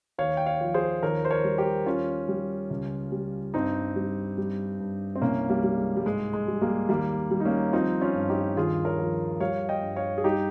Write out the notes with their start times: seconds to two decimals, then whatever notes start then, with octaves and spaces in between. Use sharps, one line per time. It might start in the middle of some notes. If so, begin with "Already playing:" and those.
0.18 D#2 C#5 F5
0.37 G5
0.46 C#5 F5
0.61 F3
0.74 G#4 C5
1.02 D#2 A#4 C#5
1.25 C5
1.31 A#4 C#5
1.44 G3
1.58 G4 A#4
1.86 D#2 C#4 F4
2.29 G3
2.70 C#2
3.12 G3
3.54 G2 C4 D#4
3.96 G3
4.38 G3
4.80 G2
5.16 C4
5.22 C2 A#3 C#4
5.49 G3 A#3
5.63 G3
5.78 G#3
5.96 G3
6.05 G#2 G#3
6.34 G#3
6.48 G3
6.62 G3 A#3
6.89 D#2 G3 A#3
7.31 G3
7.40 D#4
7.45 A#3 C#4
7.73 F3 C4 D#4
8.01 C#4 F4
8.15 G2
8.29 D#4 G4
8.56 D#2 F4 G#4
8.85 A#4 C#5
8.99 F3
9.40 G3 C#5 F5
9.69 D#5 G5
9.83 G2
9.96 C#5 F5
10.18 G#4
10.24 G3 D#4 G4